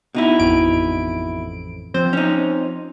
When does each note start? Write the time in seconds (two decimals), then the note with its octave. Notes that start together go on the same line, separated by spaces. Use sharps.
0.14 B2 D#4 E4
0.38 A1 F2 D7
1.94 F3 C4 C5
2.13 C#4 D#4